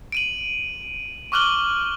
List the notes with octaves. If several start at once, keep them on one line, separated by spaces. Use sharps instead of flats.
D7 D#7 F#7
C#6 D6 F6 F#6 F#7 G7